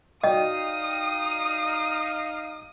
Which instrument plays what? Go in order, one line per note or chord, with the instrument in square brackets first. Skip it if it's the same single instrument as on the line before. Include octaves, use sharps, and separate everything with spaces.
[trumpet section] D#4 F5 [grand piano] F#4 D5 G5 [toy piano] D#5 [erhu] D#6